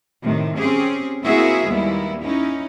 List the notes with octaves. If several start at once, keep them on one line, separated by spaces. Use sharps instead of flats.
A2 C3 D#3
C4 C#4 G4 G#4
A#3 C4 E4 F#4 G#4 E5
D#2 G3 G#3 B3 E4
C#4 D#4 E4